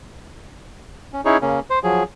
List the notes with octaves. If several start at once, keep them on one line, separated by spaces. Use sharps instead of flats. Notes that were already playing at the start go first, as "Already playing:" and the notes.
C#4
C#4 D#4 E4 G#4 C#5
C#3 A#3 C#4
C5
F3 F#3 G#4